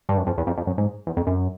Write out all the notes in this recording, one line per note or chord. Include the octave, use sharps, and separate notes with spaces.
G2
F#2
F2
E2
F2
F2
F#2
G#2
E2
F2
F#2